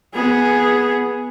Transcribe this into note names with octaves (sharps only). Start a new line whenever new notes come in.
B3 G#4